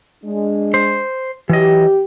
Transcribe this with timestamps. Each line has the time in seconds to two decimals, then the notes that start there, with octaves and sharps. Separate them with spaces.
0.24 G#3 D4
0.74 C5
1.49 E3 F#3 G4 D#5